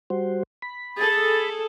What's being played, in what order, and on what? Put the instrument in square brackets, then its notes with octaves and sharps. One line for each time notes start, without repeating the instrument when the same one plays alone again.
[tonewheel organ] G3 F#4 C5
B5
[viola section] G#4 A4 [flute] A6